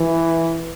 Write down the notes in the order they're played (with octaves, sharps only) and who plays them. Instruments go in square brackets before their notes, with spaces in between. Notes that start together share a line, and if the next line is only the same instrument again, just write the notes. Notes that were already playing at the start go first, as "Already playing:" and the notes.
Already playing: [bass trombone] E3